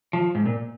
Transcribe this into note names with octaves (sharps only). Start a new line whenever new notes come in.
F3
G#2
A#2